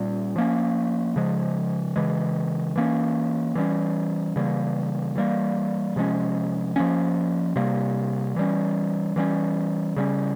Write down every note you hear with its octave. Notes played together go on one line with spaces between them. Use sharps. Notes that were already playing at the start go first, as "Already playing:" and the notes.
Already playing: A#2 G3 C#4
F3 A#3 C#4
C#3 F3 G#3
C#3 E3 G#3
E3 A#3 C#4
E3 G3 C#4
C#3 E3 G3 A#3
E3 G3 A#3
C3 F3 G#3 C#4
F3 A#3 C#4
C3 G3 A#3
E3 G3 C#4
E3 G3 A#3 C#4
C#3 G3 C#4